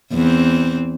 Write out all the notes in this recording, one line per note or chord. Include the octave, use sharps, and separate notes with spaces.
E2 C4